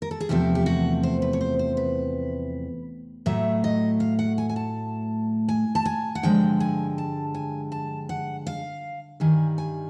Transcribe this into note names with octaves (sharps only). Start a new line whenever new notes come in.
A#4
A4
G#4
E2 C3 F3 A3 G4
G4
F#4
C5
B4
C#5
C5
C5
B4
A2 F#3 A3 E5
D#5
F5
F#5
G#5
G#5
A5
G#5
A5
G#5
F#5
G2 D3 F3 G#3 G5
G#5
A5
G#5
A5
F#5
F5
G2 D#3 G3 G#5
G#5